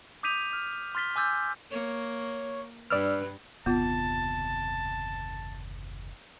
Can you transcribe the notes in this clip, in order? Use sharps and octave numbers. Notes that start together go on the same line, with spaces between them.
D6 D#6 G6 B6 D#7 F7
F6
C6 F6 A6 B6 G7
G#5 D6 E6 G6 A6
A#3 C#5
G2 B4 D5 E6 F6
F#1 D#2 C3 B3 F4 A5